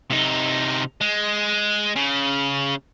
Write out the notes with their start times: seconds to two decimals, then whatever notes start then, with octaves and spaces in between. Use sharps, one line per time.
0.10 C3 D#4
1.01 G#3
1.96 C#3